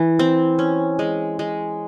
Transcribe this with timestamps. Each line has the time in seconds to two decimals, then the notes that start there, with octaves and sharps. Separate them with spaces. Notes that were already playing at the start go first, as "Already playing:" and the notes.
Already playing: E3
0.19 C4
0.59 C#4
0.99 G#3
1.39 G#3